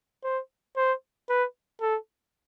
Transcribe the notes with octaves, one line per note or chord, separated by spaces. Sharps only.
C5
C5
B4
A4